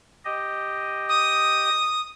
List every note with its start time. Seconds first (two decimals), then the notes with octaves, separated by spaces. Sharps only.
0.25 G4 D#5
1.09 D#6